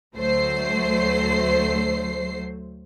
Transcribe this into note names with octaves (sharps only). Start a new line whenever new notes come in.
D2 F#3 A3 C5 C7